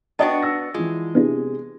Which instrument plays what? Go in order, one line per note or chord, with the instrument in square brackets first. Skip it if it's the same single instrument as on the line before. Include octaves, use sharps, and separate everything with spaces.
[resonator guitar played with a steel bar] B3 D4 F#4 [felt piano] D#5 G5 A5
[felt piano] E6 A#6
[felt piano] E3 F4 [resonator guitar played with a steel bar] G#3
[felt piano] C3 G#4 [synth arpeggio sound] B3 D4 E4